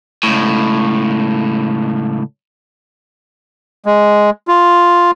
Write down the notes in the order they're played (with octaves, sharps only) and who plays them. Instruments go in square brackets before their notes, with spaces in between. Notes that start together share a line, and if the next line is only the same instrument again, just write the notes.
[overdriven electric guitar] C#2 A2
[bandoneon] G#3
F4